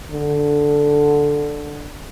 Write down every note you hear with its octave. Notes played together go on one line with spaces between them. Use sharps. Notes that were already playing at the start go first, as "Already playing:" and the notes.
D3